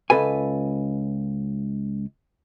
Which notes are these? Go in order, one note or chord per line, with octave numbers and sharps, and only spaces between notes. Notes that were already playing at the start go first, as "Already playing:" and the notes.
C#2 A4 B4 G#5